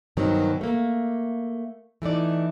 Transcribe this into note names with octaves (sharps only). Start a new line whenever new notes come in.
G2 B2 D#3 F#3 C4
A3 A#3
E3 A3 D#4 D5